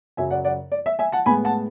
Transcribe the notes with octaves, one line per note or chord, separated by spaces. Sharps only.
F#2 C#3 F#3 E5 G#5
D5 F#5
D5 F#5
D5
E5
E5 G#5
F#5 A5
A2 G#3 B3 G#5 B5
F#5 A5